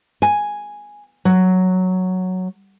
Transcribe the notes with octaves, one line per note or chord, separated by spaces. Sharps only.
G#5
F#3